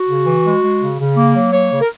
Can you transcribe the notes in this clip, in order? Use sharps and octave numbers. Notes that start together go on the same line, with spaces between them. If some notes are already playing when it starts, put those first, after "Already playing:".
Already playing: F#4
C#3
E3
G#3
G#3
C#3
C#3
A#3
F#3
A#3 C#5
C#3
A#4